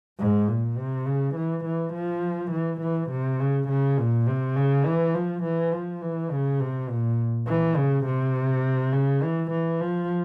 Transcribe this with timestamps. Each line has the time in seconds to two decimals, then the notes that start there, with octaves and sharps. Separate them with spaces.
0.19 G#2
0.48 A#2
0.77 C3
1.06 C#3
1.36 E3
1.65 E3
1.94 F3
2.52 E3
2.81 E3
3.10 C3
3.40 C#3
3.69 C#3
3.98 A#2
4.27 C3
4.56 C#3
4.85 E3
5.14 F3
5.44 E3
5.72 F3
6.02 E3
6.30 C#3
6.60 C3
6.89 A#2
7.47 E3
7.76 C#3
8.06 C3
8.93 C#3
9.23 E3
9.51 E3
9.81 F3